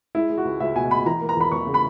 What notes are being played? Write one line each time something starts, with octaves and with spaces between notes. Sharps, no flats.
G#3 E4
G#3
F#4
C#2
C#2 E5
B2 G#5
B2 B5
E3 A#5
A#3
A#5
E2 B5
E2 C#6
C#3
B5